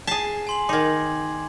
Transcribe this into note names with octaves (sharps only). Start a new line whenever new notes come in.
G#4 A5 B6 C7
G#5 C6 F#7
D#3 D#4 D6 G#6